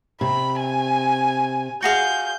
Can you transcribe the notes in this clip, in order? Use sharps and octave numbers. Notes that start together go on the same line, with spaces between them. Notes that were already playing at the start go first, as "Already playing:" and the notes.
C3 B5
G#5
F#4 G#4 F5 G6